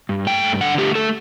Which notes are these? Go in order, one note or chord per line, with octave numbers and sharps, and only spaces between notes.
G2
A3 G5
G2
D3 F#5
A3 G4
A3 A4